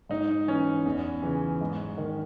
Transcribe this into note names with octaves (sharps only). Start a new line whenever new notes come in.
G#2 D#4
E3 C#4
E2
C#3 E3
G#2
D#3